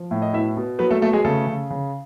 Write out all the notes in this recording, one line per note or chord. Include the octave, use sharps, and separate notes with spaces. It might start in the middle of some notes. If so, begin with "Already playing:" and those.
Already playing: F3
A2
D#5
B2 E4 E5
B2
F#3 B3 B4
A3 A4
B2 A3 A4
G#3 G#4
C#3 A3 A4
C#3
C#3